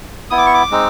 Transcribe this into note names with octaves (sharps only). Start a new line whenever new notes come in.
B3 E4 D#6
D6
C#6
D6
G#3 C4 D#4